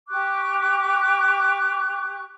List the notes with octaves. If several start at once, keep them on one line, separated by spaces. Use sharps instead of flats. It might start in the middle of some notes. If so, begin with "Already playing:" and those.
G4 C#6 D6 F#6